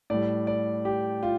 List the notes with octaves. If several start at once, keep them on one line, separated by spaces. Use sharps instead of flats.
A2 G3 D5
D5
G4
F4